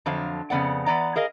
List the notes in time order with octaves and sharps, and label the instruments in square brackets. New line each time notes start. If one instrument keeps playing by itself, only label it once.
[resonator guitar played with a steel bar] F2 D3 F3 F#3 F5
F2 C#3 B3 D5 F#5
E3 B3 D5 A#5
G#4 A#4 D#5 F5